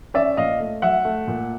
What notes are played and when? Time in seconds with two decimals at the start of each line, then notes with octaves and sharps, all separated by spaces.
0.14 C#4 D5 E5
0.37 A#2 D#5 F5
0.60 A3
0.82 F#3 E5 F#5
1.05 A3
1.27 A#2